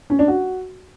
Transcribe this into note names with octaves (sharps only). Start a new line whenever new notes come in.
C#4
D4
F#4